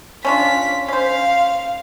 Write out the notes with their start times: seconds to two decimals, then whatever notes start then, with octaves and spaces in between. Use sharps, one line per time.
0.25 C#4 D4 F4 B6
0.88 C#4 C5 F5